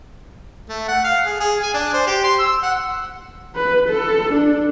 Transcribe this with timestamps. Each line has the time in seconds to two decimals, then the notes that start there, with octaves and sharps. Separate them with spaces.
0.69 A3
0.88 F#5
1.04 F5
1.25 G#4
1.40 G#4
1.62 G#5
1.74 D4
1.93 C5
2.07 G4
2.24 C6
2.39 E6
2.63 F#5
3.55 B4
3.89 A4
4.33 D4